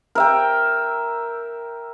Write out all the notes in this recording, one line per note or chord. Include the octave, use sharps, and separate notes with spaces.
A#4 E5 G5